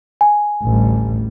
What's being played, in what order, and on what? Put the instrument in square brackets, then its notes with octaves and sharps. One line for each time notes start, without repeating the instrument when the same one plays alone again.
[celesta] G#5
[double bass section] A1 D2 G3